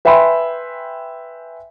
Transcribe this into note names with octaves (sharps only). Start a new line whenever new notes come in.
B4 E5 G5 G#5 B5 C6